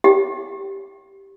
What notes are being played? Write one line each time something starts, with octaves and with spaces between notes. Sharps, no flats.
G4